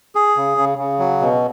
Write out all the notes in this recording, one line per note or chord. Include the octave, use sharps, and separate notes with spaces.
G#4
C#3
C#3
C#3
F#3
B2